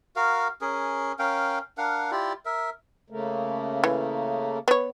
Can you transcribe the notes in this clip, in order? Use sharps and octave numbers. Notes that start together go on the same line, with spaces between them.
F#4 A#4 F5
C#4 G#4 A#4
C#4 A#4 F5 G5
D4 A#4 F5 F#5
E4 F4 G4 D5
A#4 E5
C#3 A3 A#3
E3
B3 C#5